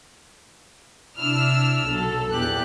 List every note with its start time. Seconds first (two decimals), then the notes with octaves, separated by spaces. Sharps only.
1.17 C3 D4 E4 E6 F6
1.87 B1 F#3 A4
2.29 A#1 E2 G4 F#6